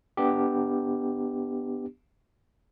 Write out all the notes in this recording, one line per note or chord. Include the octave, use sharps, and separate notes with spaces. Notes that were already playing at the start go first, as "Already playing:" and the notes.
B3 D4 G4